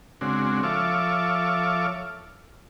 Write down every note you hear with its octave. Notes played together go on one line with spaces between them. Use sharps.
C#3 G#3 C4 D4 F#4
F3 A4 C#5 E5 F5 D6